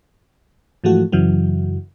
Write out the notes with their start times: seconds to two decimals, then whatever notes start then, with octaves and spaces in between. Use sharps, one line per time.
0.84 G#2 E3 F3 A3 F#4
1.12 F#2 C#3 E3 F#3